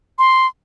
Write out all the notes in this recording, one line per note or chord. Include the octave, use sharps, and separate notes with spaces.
C6